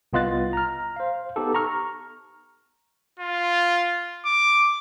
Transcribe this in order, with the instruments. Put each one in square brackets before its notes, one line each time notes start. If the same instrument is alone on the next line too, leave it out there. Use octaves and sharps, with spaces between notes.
[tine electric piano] C2 B3 F4 D#5 F#6 A6
A#5 F6
C5 F5
B3 D#4 G4 A4
A#5 C#6 F6
[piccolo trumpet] F4
D6